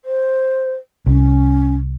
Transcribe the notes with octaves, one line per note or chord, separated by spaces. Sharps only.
C5
C2 C#4